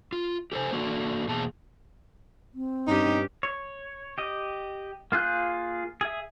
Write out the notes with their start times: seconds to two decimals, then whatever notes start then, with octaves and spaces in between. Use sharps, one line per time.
0.12 F4
0.52 G4 A4 C5 G#5
0.72 A#3 D4 F#4 A4
1.28 E2 B2 A#3 G#4 A5
2.54 C4
2.87 G2 C#4 D#4 G4
3.43 C#5
4.18 G4 D#5
5.12 A#3 F4 G#4 F#6 G6
6.01 G#4 E5